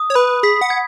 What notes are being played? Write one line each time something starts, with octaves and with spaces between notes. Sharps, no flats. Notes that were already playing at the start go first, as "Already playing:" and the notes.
Already playing: D#6
C#5
B4 B5
G#4 B6
F#5
G#6